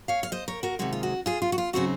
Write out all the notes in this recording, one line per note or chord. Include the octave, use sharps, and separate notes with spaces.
C#5 F5
F5
C5 D#5
A#4 C#5
F#4 A#4
C3 D#3 G#3 F#4
F4
F#4
F4 G#4
F4
F#4
F4
C#3 F#3 C4 D#4 F#4